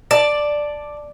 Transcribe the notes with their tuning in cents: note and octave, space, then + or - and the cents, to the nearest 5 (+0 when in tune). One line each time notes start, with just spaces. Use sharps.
D5 +5 A5 +0